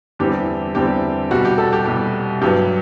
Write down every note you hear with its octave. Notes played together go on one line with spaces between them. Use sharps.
E2 D3 G3 C4 E4 G4
E2 D3 G3 C4 E4 G4
C2 B2 G3 F#4
G4
A4
G4
C2 B2 G3 G4
G2 F#3 B3 G4